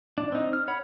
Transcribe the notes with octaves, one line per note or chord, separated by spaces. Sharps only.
D4
C4 D#4
F6
C#5 F#5 B5